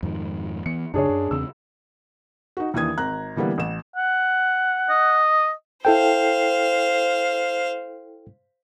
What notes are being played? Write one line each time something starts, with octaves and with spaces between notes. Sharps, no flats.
F2 G#2 D#3
E3 B3 C#7
F#2 C#3 D4 G#4 C#5
F#2
E2 C#3 C4 E6
D#4 F#4
D#2 E3 D4 D#6 G#6
G#1 A#5 F#6
D3 E3 G3 A#3 B3
A1 E7
F#5
D#5
E4 A4 C5 F5 G5